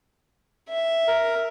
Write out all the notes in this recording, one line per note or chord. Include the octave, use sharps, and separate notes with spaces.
E5
A#4